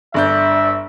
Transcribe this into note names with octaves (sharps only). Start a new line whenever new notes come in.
G1 D4 E5 G6